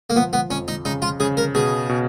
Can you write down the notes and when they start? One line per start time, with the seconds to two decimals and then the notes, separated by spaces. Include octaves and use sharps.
0.10 A#3
0.15 F3 B3
0.33 B3
0.50 F2 C#4
0.68 D#4
0.85 C#3 D#4
1.02 F4
1.20 C#3 G#4
1.37 A#4
1.55 B2 G#4
1.89 B2